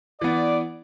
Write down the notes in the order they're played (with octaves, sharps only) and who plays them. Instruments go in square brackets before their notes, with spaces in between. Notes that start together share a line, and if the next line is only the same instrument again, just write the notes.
[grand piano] E3 B3 [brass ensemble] D5